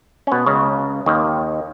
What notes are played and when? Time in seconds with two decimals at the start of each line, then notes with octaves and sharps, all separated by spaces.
0.27 C#4
0.32 B2 B3
0.46 C#2 C#3
1.06 D#2 D#3